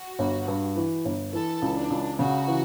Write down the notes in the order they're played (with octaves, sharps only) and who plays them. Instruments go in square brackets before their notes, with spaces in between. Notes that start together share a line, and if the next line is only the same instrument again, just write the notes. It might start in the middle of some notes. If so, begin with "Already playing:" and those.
Already playing: [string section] F#4
[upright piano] G1
G2
E3
G1
[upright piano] E3 [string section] A4
[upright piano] C#2
[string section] D4
[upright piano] C#2
[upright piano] C#3 [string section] F#4
[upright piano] E3